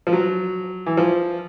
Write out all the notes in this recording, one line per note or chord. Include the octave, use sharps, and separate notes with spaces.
F3
F#3
E3
F3